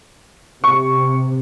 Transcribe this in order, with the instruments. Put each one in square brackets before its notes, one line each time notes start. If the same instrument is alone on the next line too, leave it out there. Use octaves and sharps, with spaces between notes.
[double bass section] C3 [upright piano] C#6